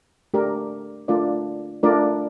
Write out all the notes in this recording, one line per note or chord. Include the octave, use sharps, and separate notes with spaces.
A3 D4 G4 A#4 D5
A3 D4 F4 A#4 D5
A3 D4 F4 A#4 D5